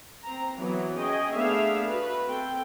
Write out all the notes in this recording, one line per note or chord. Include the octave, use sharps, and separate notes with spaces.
C4 A#5
E3 F#3 B3
C#4 G#4 D#5 G5
A3 B3 D4 G#4 E5 F5
F#4 B4
C4 A4 G5